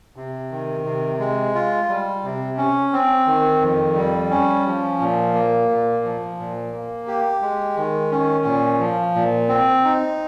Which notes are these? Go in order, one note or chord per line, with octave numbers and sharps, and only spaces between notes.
C3
D#3
C3
G#3
F4
G3
C3
C#4
C4
D#3
F2
G3
C#4
F3
A#2
A#3
A#2
F3
A#2
A#3
G4
G#3
D#3
C#4
A#2
F3
A#2
C4
D#4